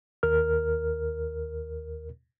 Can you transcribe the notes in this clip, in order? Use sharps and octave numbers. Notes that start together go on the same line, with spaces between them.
D#2 A#4 F6